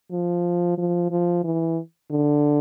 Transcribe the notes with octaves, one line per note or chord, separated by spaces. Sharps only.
F3
F3
F3
E3
D3